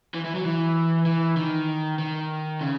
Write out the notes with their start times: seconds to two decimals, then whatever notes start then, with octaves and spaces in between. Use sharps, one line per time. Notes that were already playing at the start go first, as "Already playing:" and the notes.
0.14 E3
0.25 E3
0.35 F#3
0.45 E3
1.06 E3
1.37 D#3
1.99 D#3
2.61 C#3